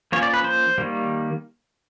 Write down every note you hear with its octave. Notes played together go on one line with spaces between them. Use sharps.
F3 A#3 C#4 C#5
D5
B4
C5
D#3 G3 A#3